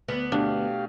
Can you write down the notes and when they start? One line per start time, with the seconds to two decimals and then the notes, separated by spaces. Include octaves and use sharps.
0.08 D2 B3
0.32 B2 A3 D4 G4 F5